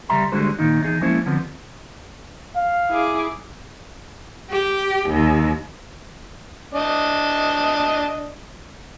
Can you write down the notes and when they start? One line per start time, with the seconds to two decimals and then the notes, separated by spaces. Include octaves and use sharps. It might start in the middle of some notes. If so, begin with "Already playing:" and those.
0.09 C#3 G3 E5 A#5 C6
0.32 D3 G3 G#3 F#4 G#4 C5
0.59 A#2 D#3 D#4
0.80 E2 D#4 G#4
1.01 F3 G#3 A#3 C#4 E4 C5
1.26 D3 F3 B3 C4
2.56 F5
2.89 E4 G#4 D6
4.50 G4
5.09 D#2
6.73 D4 D#5